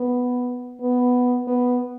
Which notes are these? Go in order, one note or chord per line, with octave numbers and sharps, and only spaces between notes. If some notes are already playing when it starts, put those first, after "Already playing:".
Already playing: B3
B3
B3